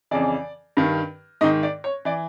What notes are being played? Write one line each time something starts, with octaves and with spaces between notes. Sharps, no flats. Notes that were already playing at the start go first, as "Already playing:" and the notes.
F2 C#3 E3 D5
G2 D#3
G#2 D#3 D#4 D#5
D5
C#5
E3 D5